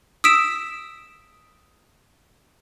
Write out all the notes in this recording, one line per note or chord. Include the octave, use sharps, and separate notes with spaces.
D#6 E6 B6 D7 E7